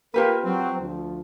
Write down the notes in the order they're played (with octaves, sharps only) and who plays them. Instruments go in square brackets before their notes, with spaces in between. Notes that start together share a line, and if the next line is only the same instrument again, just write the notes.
[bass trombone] A#3 [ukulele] F4 G4 B4 [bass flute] A#4
[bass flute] F#3 [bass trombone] C4
[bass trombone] D2 [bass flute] F3